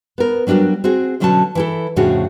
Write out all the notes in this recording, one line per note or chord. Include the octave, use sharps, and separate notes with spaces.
B3 A#4
F#3 G3 D4 F#4 A#4
C4 F#4 G#4
B2 D3 F#3 C#4 F#4 A5
E3 E4 A4
F2 A2 C#3 D4 F#4 G#4